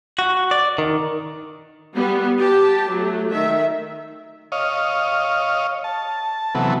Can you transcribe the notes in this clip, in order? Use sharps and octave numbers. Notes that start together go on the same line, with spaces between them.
F#4
D5
D#3
G3 B3
G4 A5
F#3 A3
D#3 E5
C#5 D#5 F5
A5
C3 E3 F#3 A3 B3